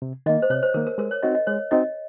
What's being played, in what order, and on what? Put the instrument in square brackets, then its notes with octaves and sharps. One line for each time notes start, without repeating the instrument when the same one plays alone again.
[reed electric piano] C3
[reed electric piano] D#3 A#3 [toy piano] D#5
[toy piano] C5
[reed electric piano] C3 [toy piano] C#5
[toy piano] C5
[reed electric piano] D#3 A#3 [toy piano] A#4
[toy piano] A#4
[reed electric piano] G#3 [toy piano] A#4
[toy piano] C#5
[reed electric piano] C4 D#4 F#4 [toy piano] D#5
[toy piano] D#5
[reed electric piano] G#3 [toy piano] C#5
[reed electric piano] C4 D#4 F#4 [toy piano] D#5